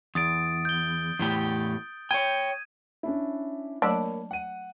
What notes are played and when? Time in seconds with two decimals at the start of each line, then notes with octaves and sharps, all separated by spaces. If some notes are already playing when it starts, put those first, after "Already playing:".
0.15 E2 D#6 A6 D7
0.65 G6 G7
1.19 E2 A2 G4
2.11 C#5 G5 G#6 D#7
3.03 C#4 D4 E4
3.82 F#3 A3 A#3 D4 C#5 B5
4.31 F#5 D#7